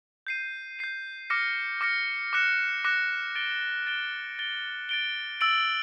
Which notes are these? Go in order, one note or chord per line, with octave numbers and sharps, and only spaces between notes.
G6 C7 D#7
G6 C7 D#7
D6 F6 A#6 C#7
D6 F6 A#6 C#7
D6 F#6 A#6 C#7 E7
D6 F#6 A#6 C#7 E7
A6 D7 G7
A6 D7 G7
A6 D7 G7
A6 D7 G7
E6 A6 D7 F#7